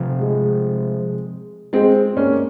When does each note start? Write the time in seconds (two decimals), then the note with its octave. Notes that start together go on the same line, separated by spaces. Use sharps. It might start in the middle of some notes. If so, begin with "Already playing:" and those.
Already playing: C3 F3 C4
0.20 G#3
1.73 G#3 C4
2.17 A#3 C#4